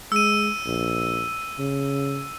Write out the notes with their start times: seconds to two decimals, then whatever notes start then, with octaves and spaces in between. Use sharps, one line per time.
0.12 G#3 E6 D#7
0.66 A#1
1.59 C#3